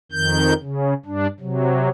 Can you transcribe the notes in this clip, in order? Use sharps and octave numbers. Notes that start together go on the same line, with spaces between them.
F2 D#3 G6
C#3
G2 D4
C3 F#3